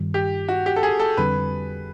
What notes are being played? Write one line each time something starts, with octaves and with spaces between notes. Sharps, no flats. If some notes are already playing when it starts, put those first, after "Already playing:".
Already playing: G2 D#3 G3
G4
F#4
G4
A4
G#4
A4
F2 D3 G3 C4 B4